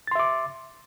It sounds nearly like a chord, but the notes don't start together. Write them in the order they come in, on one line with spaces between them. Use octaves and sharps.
A6 C6 E5 D6